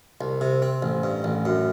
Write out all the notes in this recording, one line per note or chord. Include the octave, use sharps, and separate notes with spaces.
C2
C3
C4
A1
G2
A1
F#2